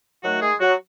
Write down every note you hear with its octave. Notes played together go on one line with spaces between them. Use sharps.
D#3 F#3 A3 F#4
G#3 G#4
F#3 F#4